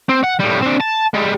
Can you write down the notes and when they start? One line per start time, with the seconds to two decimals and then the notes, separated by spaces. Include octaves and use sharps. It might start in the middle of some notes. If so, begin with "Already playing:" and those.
0.09 C4
0.23 F#5
0.39 A2 G3
0.62 C4 D4
0.80 A5
1.14 G3 G#3